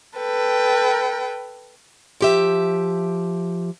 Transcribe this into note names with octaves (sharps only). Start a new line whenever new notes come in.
A4 B4 G5
F3 G4 E5